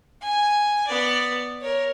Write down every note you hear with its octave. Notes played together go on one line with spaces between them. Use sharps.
G#5
B3 D5
A#4 C#5